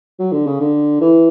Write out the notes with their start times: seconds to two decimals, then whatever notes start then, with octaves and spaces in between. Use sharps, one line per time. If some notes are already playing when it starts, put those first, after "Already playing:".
0.20 F#3
0.32 D3
0.47 C#3
0.60 D3
1.01 E3